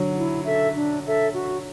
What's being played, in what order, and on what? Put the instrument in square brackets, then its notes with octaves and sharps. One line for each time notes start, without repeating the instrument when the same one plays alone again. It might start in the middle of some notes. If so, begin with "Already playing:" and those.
Already playing: [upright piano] D3 F#3
[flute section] E4
A4 E5
D4
A4 E5
F#4